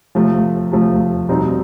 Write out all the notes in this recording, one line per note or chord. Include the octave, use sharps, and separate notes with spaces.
C3 F3 A3
C3 F3 A3
B2 G3 C4 D#4